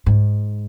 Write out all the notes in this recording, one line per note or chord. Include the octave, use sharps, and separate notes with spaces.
G#2